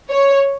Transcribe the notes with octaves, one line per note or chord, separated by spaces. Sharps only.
C#5